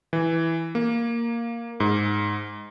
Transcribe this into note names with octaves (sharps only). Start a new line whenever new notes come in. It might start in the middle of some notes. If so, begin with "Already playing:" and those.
E3
A#3
G#2